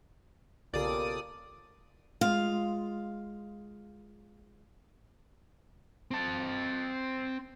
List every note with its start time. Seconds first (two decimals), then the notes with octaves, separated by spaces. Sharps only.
0.74 B1 C#3 A#3 F4 G4 A4 D5 D#6
2.21 G#3 F4 F5
6.11 C4 A5